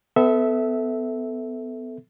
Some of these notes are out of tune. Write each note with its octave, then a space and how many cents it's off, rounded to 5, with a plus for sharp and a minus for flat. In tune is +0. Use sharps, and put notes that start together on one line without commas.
B3 +30 A4 +0 E5 -10